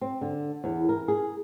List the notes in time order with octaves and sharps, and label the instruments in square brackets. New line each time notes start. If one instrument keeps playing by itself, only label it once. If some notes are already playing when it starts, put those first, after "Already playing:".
[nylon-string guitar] C4
D3
E2
A#4
G#4